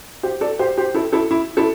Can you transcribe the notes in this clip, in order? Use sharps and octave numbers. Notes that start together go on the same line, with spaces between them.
G4 C5
A4 D5
G4 C5
G4 C5
E4 A4
E4 A4
E4
E4 A4